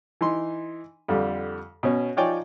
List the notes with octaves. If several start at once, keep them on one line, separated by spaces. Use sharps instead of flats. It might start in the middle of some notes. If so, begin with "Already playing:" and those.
E3 D#4 C6
F2 D3 G3
B2 C#4
F3 D#4 C#5 D5 G5 G#5